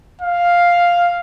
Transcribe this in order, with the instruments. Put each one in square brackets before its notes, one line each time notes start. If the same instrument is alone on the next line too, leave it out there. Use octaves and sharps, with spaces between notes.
[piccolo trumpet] F5